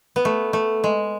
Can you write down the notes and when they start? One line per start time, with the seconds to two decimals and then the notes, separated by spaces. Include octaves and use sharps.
0.16 B3
0.25 A3
0.53 A3
0.84 G#3